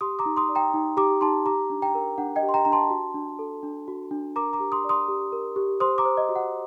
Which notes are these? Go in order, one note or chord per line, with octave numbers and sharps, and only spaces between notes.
G4 C6 D#6
A#5 D6
D#4
C6 D#6
D5
G5 A#5
D#4
G4 A#5 D6
D#4 A5 C6
G4 A#5 D6
D4
G5 A#5
A#4
D4 F#5
D#5 G5
G4
C6
G5 A#5
D4 A#5
A5 C6
F#4
D4
A4
D4
F#4
D4
A#4 A#5 D6
A#5 D6
G4
C6 D#6
D5
C6 D#6
G4
A#4
G4
C5 C6 D#6
A#5 D6
C5
D#5
F#4
F#5